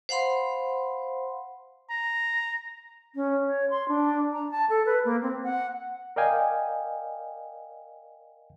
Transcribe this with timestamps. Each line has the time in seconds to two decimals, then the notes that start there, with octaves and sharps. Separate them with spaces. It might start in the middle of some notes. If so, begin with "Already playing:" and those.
0.09 C5 F5 F#5 B5 C6
1.90 A#5
3.15 C#4
3.47 C#5
3.70 C6
3.88 D4
4.33 A#5
4.51 A5
4.70 A4
4.86 B4
5.05 A#3
5.22 C4
5.43 F#5
6.16 A#4 D5 D#5 F5 G5 G#5